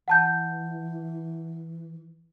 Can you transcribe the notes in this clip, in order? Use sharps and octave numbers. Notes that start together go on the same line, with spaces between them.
E3 F#5 A5 G6